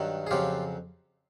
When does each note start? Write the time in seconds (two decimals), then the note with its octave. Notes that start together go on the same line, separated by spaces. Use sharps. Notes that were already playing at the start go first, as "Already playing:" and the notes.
Already playing: G2 D#3 F#3
0.27 G#4
0.31 F2 C#3 F#3 F4 G4